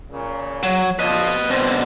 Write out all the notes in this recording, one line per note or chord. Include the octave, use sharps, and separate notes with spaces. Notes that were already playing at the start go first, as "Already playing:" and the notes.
A#2 C#3
F#3
D3 F3 B4 D#5
B2 D3 C4